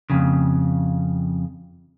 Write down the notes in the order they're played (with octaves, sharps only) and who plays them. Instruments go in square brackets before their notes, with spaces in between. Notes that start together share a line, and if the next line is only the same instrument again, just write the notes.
[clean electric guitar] F2 C#3